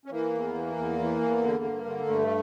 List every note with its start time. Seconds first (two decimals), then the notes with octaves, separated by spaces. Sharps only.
0.05 C#4
0.10 E3 A#3
0.33 E2
0.54 E3
0.76 E2
0.99 E3
1.21 E2
1.42 D3
1.64 G2
1.86 D3
2.07 G2 A3